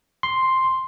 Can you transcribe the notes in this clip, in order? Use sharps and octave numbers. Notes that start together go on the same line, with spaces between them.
C6